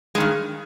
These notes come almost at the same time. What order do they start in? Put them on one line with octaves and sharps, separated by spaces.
G#3 D#3 G2